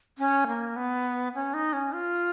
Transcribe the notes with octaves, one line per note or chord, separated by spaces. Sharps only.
C#4
A#3
B3
C#4
D#4
C#4
F4